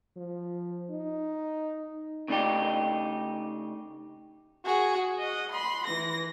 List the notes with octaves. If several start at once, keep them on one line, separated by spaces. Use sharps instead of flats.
F3
D#4
C#3 A3 D4 D#4 G4
F#4 G#4
D#5 F#5
B5 C6
E3 A#6